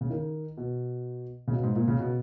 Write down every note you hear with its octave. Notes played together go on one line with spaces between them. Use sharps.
C#3
D#3
B2
C#3
B2
G#2
A#2
C#3
B2